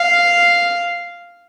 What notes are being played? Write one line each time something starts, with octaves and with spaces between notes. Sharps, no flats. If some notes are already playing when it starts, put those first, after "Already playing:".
Already playing: F5